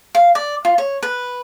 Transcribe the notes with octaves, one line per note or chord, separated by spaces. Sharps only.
F5
D5
F4
C#5
B4